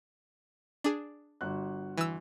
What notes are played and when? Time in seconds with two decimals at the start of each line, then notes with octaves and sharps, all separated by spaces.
0.84 D4 G#4
1.41 G1 F#4 F#6
1.98 E3 E6